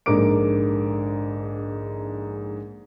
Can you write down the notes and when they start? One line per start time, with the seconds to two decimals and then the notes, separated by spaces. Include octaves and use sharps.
0.06 A#1 G#2 D3 A#4 D6 D7